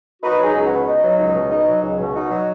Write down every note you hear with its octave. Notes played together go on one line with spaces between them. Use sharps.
D#4 F#4 B4
F#3
D#4 G#4
C#2
F#4 B4
B2
D#4
F#3
C#2 D#4
B2
D#4
F#3
C#2
B2
D#4 F#4
F#3